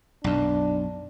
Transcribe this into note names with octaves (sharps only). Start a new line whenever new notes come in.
B1 F#2 D4